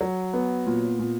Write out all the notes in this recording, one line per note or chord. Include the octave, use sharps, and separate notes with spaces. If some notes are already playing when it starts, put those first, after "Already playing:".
F#3
B3
A#2
A#2